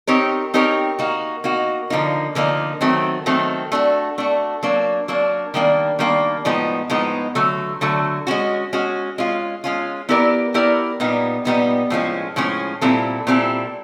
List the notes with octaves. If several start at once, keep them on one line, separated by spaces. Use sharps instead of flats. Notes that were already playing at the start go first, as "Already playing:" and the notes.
C4 D#4 G4 A#4 C#5
C4 D#4 G4 A#4 C#5
A#3 D#4 F#4
A#3 D#4 F#4
D3 F3 A#3 D#4
D3 F3 A#3 D#4
D#3 F#3 A3 C4
D#3 F#3 A3 C4
A3 D4 F#4
A3 D4 F#4
F#3 A#3 D4
F#3 A#3 D4
D#3 G3 A#3 D4
D#3 G3 A#3 D4
A2 F3 G#3 B3 D#4
A2 F3 G#3 B3 D#4
D3 F#3 A3
D3 F#3 A3
G#3 C#4 F#4
G#3 C#4 F#4
G#3 C#4 F4
G#3 C#4 F4
B3 E4 G4 A#4 D5
B3 E4 G4 A#4 D5
A#2 G3 B3 D#4
A#2 G3 B3 D#4
A2 F3 G#3 C#4
A2 F3 G#3 C#4
A#2 G3 C4 E4 A4
A#2 G3 C4 E4 A4